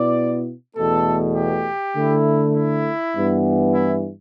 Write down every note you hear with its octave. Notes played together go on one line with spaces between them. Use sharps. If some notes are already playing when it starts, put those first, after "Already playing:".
Already playing: B2 B3 E4 D5
E2 B2 A3 A4
G4
D3 A3 E4
E4
G2 E3 B3
E4